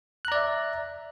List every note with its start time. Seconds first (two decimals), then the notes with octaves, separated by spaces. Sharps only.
0.25 F#6
0.28 A#5
0.32 D5
0.35 E5